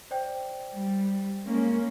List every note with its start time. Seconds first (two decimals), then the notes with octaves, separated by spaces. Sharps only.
0.11 C5 D5 G5
0.73 G3
1.45 G#3 A#3 C#4